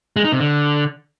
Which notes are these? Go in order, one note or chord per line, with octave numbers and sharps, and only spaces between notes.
G#3
D#4
C3
D3